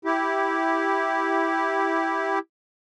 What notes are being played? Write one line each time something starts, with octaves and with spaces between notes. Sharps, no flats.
E4 G4